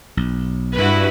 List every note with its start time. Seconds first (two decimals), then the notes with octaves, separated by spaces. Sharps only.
0.17 B1
0.75 G2 E4 F#4 B4